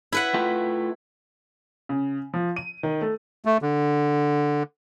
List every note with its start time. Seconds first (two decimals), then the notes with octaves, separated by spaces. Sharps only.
0.12 E4 B4 F#5
0.34 A3 F4 G5
1.89 C#3
2.34 F3
2.56 D#7
2.83 D#3
3.01 A3
3.45 A3
3.62 D3